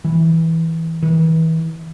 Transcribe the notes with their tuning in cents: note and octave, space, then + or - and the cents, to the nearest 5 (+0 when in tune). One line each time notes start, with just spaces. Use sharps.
E3 -15
E3 -35